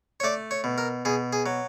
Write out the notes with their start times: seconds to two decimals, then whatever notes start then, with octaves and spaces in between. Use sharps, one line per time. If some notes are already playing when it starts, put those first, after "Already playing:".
0.20 C#5
0.24 A3 D5
0.51 C#5
0.64 B2
0.78 A#4
1.05 B2 G#4
1.33 G#4
1.46 F#3